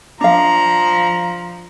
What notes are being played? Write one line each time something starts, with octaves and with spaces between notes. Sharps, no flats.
F3 D4 F5 A#5